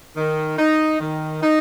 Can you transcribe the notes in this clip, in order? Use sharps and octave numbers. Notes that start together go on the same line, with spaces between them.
D#3
D#4
D#3
D#4